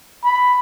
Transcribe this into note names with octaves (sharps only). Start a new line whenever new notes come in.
B5